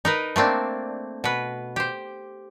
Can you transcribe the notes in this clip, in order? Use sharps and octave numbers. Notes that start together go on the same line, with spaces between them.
D#4 A#4 B4
A3 A#3 C4 D4
B2 B4
G4 C5